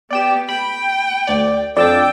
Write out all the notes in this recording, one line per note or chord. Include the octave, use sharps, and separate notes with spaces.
B3 G4 D5 G5 E7
G5 B5
D2 D5
F2 D4 D5 G5 E6 A6